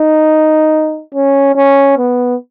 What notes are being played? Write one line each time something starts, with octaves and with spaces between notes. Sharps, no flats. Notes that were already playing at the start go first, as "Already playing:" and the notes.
Already playing: D#4
C#4
C#4
B3